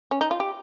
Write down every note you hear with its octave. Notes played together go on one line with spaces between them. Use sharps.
C#4
D#4
F4
G4